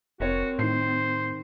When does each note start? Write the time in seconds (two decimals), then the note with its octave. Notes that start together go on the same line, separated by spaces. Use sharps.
0.20 F1 C4 F#4 A#4 C#5
0.59 A2 D#3 C5 C7